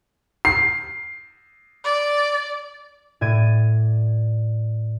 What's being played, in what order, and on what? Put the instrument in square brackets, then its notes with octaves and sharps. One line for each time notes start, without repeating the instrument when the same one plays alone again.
[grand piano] C7
[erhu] D5
[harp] A2 D5 G#6 A6 D#7